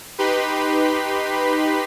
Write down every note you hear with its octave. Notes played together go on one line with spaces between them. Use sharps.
D#4 G4 B4 B5 C6